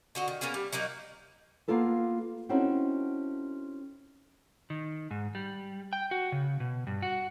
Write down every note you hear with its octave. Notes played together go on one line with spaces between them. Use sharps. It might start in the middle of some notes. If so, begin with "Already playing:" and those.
D3 F#4 D#5
D#3
A#3 B3 C#4 G#4
G3
F#3 A#3 D#4 D5
A#3 B3 F4 A4 B4
C4 C#4 D#4 E4 F#4 A4
D#3
G#2
G3
G5
F#4
C#3
B2
G2
F#4